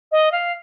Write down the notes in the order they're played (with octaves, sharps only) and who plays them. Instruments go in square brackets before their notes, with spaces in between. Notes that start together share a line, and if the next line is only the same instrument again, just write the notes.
[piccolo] D#5
F5